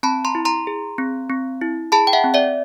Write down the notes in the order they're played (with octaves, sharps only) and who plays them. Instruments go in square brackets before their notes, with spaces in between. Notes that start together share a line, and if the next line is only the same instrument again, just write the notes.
[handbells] C4 A5 B5
A#5 C6
E4
A#5 C6
G#4
C4
C4
E4
G#4 A5 B5
G5
E5 F#5
C4
D5 E5